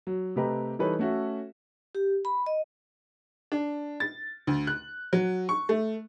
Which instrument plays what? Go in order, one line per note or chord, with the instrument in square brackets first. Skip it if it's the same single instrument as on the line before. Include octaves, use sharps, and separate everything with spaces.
[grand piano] F#3
C3 A3 G4 B4 D#5 A#5
E3 G3 D#4 A4 B4 C#5
A3 C#4 F#4 A4 E5
[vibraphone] G4
B5
D#5
[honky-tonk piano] D4
A6
D2
F#6
F#3
C#6
A3